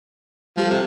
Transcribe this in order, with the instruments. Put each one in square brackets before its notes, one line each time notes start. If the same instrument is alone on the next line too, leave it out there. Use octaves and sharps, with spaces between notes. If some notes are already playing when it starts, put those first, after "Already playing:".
[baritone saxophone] F3 [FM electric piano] G3 G4 A4
[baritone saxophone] C3